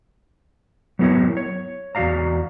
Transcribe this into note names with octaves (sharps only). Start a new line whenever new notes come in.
F#3 B3 E4 A#4 C#5
C#5
E2 F#4 D5 F5 A#5